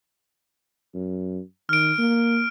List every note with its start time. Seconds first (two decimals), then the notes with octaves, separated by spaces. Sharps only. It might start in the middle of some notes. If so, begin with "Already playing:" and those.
0.95 F#2
1.69 D#3 F6 D7
1.98 A#3